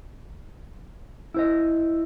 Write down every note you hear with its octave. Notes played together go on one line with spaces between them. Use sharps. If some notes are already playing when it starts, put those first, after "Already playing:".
E4 C5 D#5